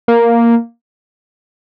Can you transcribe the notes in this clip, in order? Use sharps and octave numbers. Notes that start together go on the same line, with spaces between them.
A#3